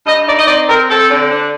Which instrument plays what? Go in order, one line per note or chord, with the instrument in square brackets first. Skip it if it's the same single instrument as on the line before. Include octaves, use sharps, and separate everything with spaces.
[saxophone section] G2 D#5
D#4 D5
D#5
C4 D5
C4 A#4
C4 A4
D3
D4